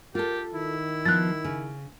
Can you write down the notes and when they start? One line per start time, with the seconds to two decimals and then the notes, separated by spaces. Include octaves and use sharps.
0.15 F4 G4 A4 A#4
0.53 D#3 E4
1.06 F3 B3 F#6 A6
1.44 C#3